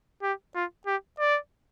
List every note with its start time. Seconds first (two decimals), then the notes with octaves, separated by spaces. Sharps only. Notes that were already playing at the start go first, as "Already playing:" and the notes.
0.23 G4
0.55 F4
0.87 G4
1.19 D5